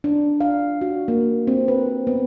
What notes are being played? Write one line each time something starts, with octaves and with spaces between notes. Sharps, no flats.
D4
F5
F#4
A#3
C4
B4
B3